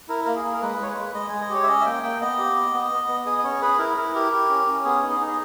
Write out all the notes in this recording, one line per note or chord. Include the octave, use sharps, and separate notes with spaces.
E4 A#4
A#3 A#4
G#4
A#3
A#4
G#3 B4
G#3 C#5
B4
G#3
G#3 D#5
G#3 G#5
D#5
G4 C#5
E5
C#4 D#5
E5
A#3 G5
A#3 G5
B3 D#5
G4
B3
B3
B3
B3
G#4 D#5
D#5
C#4 C#5
G#4 B4
E4 A#4
E4 A#4
G4 A#4
G4
C#4
C#4
B3 G#4
D#4
G#4
D#4
G#4